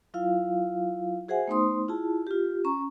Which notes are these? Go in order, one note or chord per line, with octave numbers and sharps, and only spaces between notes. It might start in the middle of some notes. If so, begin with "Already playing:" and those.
F#3 E4 F4 F5
F#4 G#4 C5 E5 F#5 G#5
A3 B3 D#4 C5 C6 D#6
E4 F4 G#4 A5
F4 G4
C#4 A#5 C#6